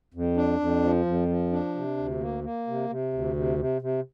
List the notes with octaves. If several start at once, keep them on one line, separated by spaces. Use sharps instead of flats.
F2
D4
F2
F3
F2
F3
D4
C3
D2
A#3
A#3
C3
C3
D2
C3
C3
C3